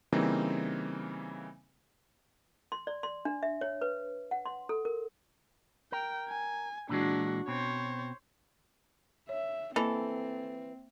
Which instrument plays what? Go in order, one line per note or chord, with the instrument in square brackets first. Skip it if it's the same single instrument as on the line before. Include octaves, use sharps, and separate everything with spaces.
[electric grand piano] C#3 E3 G3 A#3 C4 D#4
[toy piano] C6
D5
C6
D4
E5
C#5
B4
F#5
C6
A4
A#4
[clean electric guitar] A#4 [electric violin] G5
[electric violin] G#5
[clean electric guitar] A#2 E3 G#3 [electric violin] D4 F#4
[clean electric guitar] B2 C4 [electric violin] C5 C#5
[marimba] C#5 [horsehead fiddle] E5
[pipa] E3 [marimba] A#3 D#5 [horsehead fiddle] C4 [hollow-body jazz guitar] A4